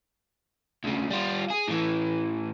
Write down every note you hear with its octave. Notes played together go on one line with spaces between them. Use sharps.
D2 C#3
G3 F4
G#4
A2 E3